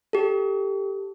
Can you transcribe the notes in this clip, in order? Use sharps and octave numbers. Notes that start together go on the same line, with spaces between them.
G4 A4